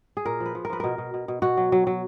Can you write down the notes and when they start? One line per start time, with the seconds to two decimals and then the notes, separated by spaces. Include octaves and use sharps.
0.17 G#4
0.26 A#2 A#4
0.40 F3
0.46 B4
0.55 F3
0.65 A#4
0.70 F3 B4
0.80 B2 A#4
0.98 B2
1.14 B2
1.28 B2
1.42 B2 F#4
1.57 F#3
1.72 F#3
1.87 F#3